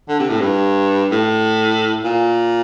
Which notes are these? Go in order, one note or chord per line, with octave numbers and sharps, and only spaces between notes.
D3
C3
A2
G2
A2
A#2